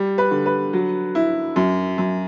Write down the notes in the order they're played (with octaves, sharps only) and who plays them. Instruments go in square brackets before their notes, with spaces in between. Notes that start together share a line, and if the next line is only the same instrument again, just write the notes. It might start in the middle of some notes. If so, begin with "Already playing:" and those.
Already playing: [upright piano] G3
B4
D3
B4
F#3
E4
F#2
F#2